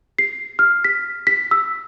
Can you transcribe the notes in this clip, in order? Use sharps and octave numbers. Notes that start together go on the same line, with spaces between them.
C7
F6
B6
B6
E6